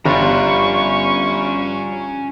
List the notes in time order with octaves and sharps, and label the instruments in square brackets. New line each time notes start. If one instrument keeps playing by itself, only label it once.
[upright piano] G1 [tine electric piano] G3 F4 [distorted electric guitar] C#4 A#5 [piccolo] C#6